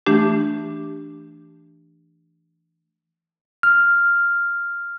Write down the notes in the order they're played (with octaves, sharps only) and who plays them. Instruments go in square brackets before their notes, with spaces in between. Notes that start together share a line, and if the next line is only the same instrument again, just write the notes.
[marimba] E3 A3 D4 G4
[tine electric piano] F6